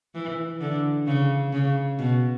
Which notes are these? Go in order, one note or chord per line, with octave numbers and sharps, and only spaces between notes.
E3
D3
C#3
C#3
B2